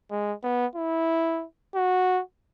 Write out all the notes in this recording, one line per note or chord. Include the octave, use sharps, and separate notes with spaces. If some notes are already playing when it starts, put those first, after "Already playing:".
G#3
B3
E4
F#4